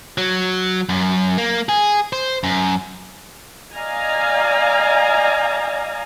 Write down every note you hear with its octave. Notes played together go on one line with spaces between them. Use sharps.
F#3
F#2
A#3
G#4
C5
F#2
D5 D#5 F5 G#5 A#5